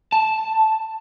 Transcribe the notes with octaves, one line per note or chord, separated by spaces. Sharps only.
A5